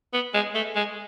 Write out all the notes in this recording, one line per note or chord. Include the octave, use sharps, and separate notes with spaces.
B3
G#3
A3
G#3